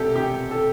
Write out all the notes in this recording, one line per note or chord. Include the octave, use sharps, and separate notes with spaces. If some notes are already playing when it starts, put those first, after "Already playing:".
Already playing: E1 C3 G4 A4
C3 G4
A4